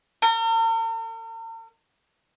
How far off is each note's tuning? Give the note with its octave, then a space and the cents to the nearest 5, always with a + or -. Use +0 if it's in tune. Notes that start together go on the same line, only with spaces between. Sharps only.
A#4 -45